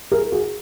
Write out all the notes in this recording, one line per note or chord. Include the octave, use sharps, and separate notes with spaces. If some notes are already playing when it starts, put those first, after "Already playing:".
G#4 A#4
F#4 G#4